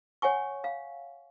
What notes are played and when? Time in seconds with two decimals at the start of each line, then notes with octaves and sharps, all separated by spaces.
0.22 C#5 F#5 G#5 C#6
0.64 F5